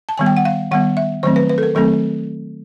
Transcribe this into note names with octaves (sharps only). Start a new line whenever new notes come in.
A5
D#3 G3 B3 G#5
G5
F#5
F5
D#3 G3 B3 F#5
E5
D#3 F#3 A3 C4 C5
B4
B4
A4
A#4
D#3 F#3 A3 C4 A4